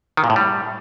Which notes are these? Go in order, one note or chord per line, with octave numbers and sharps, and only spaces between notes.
D#3
A#2
A2
G3